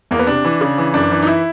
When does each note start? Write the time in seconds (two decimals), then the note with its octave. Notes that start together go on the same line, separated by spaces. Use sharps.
0.11 E2 A#3
0.19 B3
0.27 C3 D4
0.44 E3
0.61 C#3
0.78 E3
0.94 F#2 D4
1.11 E3
1.22 D#4
1.27 E4